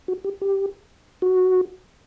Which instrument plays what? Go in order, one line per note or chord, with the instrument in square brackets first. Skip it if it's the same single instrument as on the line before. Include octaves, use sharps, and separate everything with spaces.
[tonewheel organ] F#4
G4
G4
F#4